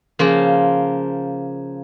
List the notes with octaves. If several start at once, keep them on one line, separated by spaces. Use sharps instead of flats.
C#3 F3 A#3